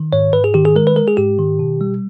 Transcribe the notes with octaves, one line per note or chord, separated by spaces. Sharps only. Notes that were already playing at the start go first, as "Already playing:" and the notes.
Already playing: D#3
G#2 C#5
G#2 B4
G#4
D#3 G4
G#4
G#3 A#4
B4
G#3 A#4
G#4
G#2 G4
D#3
B2
G3